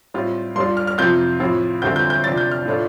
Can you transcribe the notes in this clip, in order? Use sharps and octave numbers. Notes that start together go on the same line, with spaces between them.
A2 G3 C4 F4
G2 G3 D4 F4 C6
F6
F6
F2 C3 F3 C4 F4 G6
A2 F3 C4 F4
D2 D3 G3 C4 F4 G6
G6
G6
C3 F3 D4 F4 A6
G6
F6
A2 A3 D4 F4